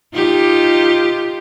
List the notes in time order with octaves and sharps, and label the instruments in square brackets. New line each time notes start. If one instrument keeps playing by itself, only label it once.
[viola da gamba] D#4 F4 G4